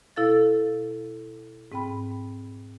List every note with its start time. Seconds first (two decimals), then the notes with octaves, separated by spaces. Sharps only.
0.16 B2 E4 A4 F5 A6
1.72 G#2 C4 G5 B5